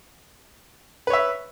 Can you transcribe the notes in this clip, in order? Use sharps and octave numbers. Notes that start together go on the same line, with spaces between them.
B4 C#5 E5